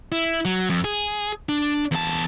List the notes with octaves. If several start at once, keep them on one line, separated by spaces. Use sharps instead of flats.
E4
F#3
F2
G#4
D4
E2 A5